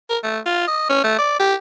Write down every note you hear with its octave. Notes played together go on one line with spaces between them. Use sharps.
A#4
A3
F4
D#5
C#4
A3
D5
G4